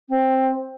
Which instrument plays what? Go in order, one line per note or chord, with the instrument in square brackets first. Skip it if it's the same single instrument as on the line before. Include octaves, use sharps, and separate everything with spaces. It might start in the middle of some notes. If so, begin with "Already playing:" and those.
[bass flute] C4